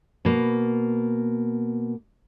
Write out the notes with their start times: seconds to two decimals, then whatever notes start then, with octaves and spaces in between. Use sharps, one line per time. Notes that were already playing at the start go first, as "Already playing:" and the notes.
0.25 B2 A#3